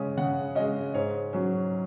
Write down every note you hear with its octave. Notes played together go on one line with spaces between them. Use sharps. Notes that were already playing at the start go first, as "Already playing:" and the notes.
Already playing: C#3 G#3 C#4 D#6
C#3 F#5
G#3 C#4 D#5
G#2 C#5
F#3 C#4